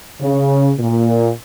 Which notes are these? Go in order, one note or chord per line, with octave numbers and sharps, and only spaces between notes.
C#3
A#2